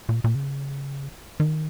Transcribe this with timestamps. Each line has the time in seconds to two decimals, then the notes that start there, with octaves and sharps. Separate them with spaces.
0.09 A#2
0.24 A#2
0.35 C#3
1.40 D#3